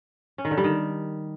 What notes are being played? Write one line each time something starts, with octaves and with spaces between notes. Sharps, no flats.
C#4
D#3
D3
G3
D#3